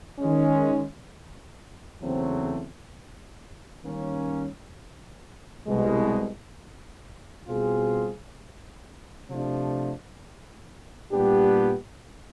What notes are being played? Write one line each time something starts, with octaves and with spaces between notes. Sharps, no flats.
D#3 G#3 C#4
E2 C#3 F#3 A3 C4
D#3 G3 A#3 C#4
C2 B2 G#3
B2 G3 C4 F4 G#4
C3 F3 A3 D4
A#2 G3 B3 D4 G4